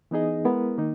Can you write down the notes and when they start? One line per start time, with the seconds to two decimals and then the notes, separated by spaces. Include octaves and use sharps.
0.11 E3 B3 D#4 G#4 D#5
0.45 G#3 B3 E4 A#4
0.78 D#3 A#3 D#4